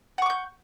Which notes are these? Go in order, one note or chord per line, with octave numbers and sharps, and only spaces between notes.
F#5 C#6 D6 G6